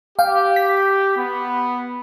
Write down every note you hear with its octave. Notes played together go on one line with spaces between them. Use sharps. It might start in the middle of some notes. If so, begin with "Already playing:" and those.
G4 F5 G5
B6
B3